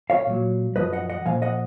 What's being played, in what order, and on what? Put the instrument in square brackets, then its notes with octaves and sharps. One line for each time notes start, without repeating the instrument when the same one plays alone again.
[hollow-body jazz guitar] C#5 F5
A#2 F#3
F#2 F3 B4 D#5
D#5 F#5
D#5 F#5
A#2 F3 F5 G#5
D#5 F#5